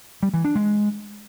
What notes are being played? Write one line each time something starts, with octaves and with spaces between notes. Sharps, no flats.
G3
E3
D4
G#3